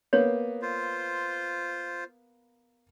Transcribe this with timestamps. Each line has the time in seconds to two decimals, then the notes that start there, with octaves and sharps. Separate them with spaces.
0.13 A#3 B3 C#5
0.62 F4 C5